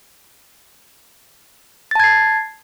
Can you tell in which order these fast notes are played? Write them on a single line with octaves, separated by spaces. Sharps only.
A6 A5 G#6 C7